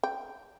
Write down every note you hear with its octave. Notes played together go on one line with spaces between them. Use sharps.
G5